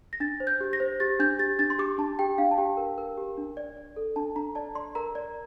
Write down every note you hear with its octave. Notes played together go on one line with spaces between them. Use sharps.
A#6
D4 A6
C5
G6
G4
A#6
C5
G4 A6
D4 G6
G4 A6
D4 A6
C6
G4 D6
D4 A5
G4 G5
D4 F5
A5
G4 G5
A#4
A#4
G4
D4
D5
D5
A4
D4 A5
D4 A#5
D5 A5
D5 C6
A#4 A#5
D5